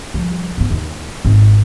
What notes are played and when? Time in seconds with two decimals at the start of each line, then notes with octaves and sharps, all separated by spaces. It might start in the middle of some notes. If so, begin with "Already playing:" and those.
0.14 F3 G3
0.57 G2 B3
0.70 D#2
1.25 G#1